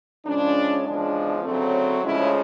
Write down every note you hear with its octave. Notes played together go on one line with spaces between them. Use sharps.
C#3 F3 G#3 C#4 D4
E2 C#3 F3 G#3 D4
D2 C#3 F#3 A3 C4
D2 C#3 F3 G#3 C#4 E4